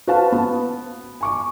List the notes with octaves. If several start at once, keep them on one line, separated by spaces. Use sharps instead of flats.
F#4 B4 C5 F5 A5
B3
G#5 C#6 D6